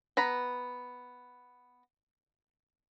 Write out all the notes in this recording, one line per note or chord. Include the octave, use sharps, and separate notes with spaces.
B3 A#5 B5